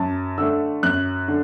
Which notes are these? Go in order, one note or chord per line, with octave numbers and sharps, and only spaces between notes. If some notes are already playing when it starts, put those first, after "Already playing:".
Already playing: F#2 A5
D3 A3 E6
F#2 F#6
D3